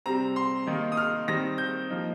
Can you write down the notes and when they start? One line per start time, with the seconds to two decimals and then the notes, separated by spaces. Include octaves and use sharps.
0.06 C3 G3 C4 A#5
0.36 C6
0.67 D#3 A#3 D#4
0.92 D#6
0.97 F6
1.28 D#3 G3 C4 A#6
1.58 G6
1.90 F3 A#3 D#4